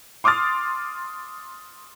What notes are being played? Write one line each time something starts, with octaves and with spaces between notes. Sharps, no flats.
C6 D6 D#6 F6 A6